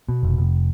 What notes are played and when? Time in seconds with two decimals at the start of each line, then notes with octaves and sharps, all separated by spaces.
0.09 B2
0.23 F1
0.38 F1